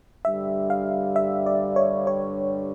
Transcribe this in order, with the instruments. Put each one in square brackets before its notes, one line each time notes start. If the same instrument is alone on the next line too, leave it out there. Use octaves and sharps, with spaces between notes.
[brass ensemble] G2 D3 G3 [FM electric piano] E5
[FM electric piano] F5
E5
D5
C#5
C#5